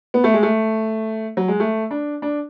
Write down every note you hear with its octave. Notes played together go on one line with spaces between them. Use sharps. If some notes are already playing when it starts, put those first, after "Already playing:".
B3
A3
G#3
A3
F#3
G#3
A3
D4
D4